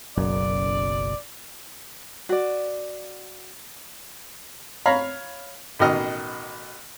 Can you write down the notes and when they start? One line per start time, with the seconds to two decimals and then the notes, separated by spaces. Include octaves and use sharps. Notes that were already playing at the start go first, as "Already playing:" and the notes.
0.17 F#1 B1 F#2 D5
2.29 F#4 D5
4.86 C#5 F5 A#5 B5
5.79 A1 B2 D#3 D#5 F6